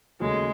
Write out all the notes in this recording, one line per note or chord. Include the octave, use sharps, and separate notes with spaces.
D#2 C#3 F#3 G#3 A3